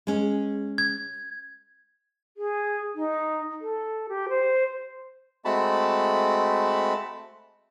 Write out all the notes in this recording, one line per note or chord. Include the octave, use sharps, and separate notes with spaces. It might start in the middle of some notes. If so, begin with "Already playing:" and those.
G#3 C#4
G#6
G#4
D#4
A4
G4
C5
G#3 A3 C4 F#4 A5 B5